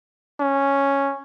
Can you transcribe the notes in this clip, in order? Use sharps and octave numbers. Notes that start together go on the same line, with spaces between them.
C#4